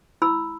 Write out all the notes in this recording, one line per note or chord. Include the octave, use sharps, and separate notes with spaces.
E4 B5 E6